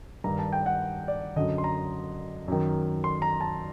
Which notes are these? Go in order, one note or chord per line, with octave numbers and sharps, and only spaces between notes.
G2 D#3 A#5
A5
G5
F#5
D5
F#2 D3 D#5
C6
A#5
F#2 D#3
C6
A#5
A5